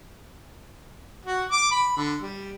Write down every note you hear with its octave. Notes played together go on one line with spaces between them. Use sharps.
F#4
D6
B5
D3
G3